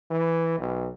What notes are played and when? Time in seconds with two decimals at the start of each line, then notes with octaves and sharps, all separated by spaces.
0.11 E3
0.58 B1